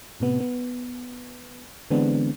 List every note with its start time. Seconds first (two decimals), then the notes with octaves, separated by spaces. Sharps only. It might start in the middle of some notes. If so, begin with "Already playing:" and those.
0.20 A2 C3 B3
0.40 B3
1.90 D3 E3 G#3 B3 C4 D4